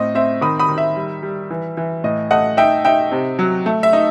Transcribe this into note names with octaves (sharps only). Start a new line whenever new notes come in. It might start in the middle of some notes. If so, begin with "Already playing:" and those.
Already playing: A2 C4 D#5
C4 E5
D#3 B5 D#6
B5 D#6
D#3
E5
G3
G3
E3
E3
A2 D#5
A3 D#5 F#5
D#4 E5 G5
D#4 E5 G5
C3
F#3
A3
E5
D#4